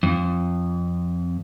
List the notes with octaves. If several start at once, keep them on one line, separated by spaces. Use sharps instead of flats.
F2